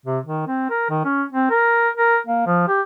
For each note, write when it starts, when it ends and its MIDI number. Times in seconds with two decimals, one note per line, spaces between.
0.05 0.19 48
0.25 0.47 51
0.47 0.67 60
0.70 0.87 70
0.90 1.03 51
1.05 1.23 61
1.32 1.49 60
1.50 1.89 70
1.97 2.19 70
2.27 2.42 58
2.46 2.67 53
2.68 2.81 67